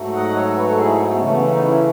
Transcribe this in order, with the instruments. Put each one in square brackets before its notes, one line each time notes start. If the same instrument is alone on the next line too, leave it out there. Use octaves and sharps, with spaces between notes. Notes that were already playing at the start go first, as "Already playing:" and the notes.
Already playing: [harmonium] G#2 F#3 A3
D#5 F#5
A4 C#5
B4
A4
E4 G#4
B3
C#3 E3 A3 C#4
B3
C#4
B3 D#4
C#4 E4